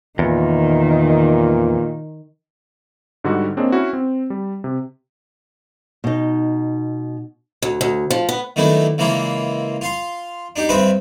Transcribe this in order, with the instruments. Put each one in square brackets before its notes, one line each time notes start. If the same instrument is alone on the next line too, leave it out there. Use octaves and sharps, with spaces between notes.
[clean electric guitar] E2 [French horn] A#2 [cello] D#3
[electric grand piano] G#2 D3 G3 D#4 F#4
A#3 C4 D4 G#4 C#5 D#5
C#4 E4 F#4
C4
G3
C3
[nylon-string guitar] B2 D#4
[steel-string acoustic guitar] D2
D2
F3
B3
[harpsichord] D#3 F#3 A3 B3 D4 E4
C#3 E3 G#3 A#3 E4 F4
F4 F5 C6
D4 D#4 G4
G2 G#3 C4 B4 E5 B5